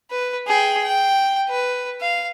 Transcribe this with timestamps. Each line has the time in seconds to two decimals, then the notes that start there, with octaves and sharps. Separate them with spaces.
0.11 B4
0.47 G#4 G5
0.83 G5
1.49 B4
2.01 F5